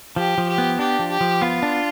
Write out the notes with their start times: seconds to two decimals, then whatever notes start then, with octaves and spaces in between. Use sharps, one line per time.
0.16 F3 G4
0.38 F3
0.48 G4
0.58 B3
0.79 D4 G4
0.99 F3
1.10 G4
1.21 F3
1.41 B3 F4
1.63 D4